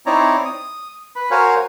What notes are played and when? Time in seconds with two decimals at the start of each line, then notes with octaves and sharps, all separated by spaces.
0.06 C4 D#4 E4 C#5 D5 A#5
0.45 D#6
1.16 B4 B5
1.31 F#4 A#4 C5 C#5 F5 G#5